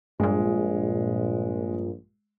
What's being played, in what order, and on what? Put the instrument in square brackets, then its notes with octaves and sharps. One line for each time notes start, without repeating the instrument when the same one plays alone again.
[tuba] A#1 [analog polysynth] G2 A#2 [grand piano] G#3